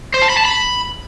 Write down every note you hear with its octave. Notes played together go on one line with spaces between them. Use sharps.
C5
A5
B5
A5
B5